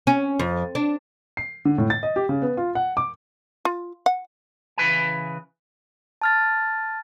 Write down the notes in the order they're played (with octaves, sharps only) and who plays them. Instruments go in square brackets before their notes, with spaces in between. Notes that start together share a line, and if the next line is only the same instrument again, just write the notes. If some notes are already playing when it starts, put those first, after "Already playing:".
[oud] C#4
F2
D4
[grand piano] C7
D3
A2
A6
D#5
G4
C#3
B3
F4
F#5
D6
[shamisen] F4
F#5
[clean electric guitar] C#3 E3 B4 G#5
[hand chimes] A5 F6 A6